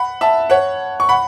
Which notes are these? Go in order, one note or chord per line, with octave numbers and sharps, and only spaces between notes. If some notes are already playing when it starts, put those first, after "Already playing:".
Already playing: F#5 B5
E5 A5
C#5 F#5
C#6
F#5 B5